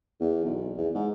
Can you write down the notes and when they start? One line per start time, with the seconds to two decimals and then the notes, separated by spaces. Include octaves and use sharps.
0.20 E2
0.45 B1
0.77 E2
0.94 G#2